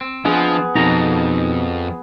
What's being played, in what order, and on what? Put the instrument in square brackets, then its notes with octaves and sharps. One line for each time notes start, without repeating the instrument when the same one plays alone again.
[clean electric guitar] C4
[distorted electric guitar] F3 [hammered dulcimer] B3 G#4 F#5 [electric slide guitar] D4 D#5 G#5
[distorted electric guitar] F2 [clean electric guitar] B2 A#5 [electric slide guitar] D#4 A4